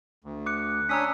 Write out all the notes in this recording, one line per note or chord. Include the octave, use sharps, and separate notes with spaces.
D2
D6 F#6 C#7
C#4 D4 A#5 D#6 E6 B6